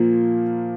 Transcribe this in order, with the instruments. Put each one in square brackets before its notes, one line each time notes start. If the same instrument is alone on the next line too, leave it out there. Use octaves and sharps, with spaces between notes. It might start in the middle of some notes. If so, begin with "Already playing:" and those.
Already playing: [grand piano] A#2 F3 A#3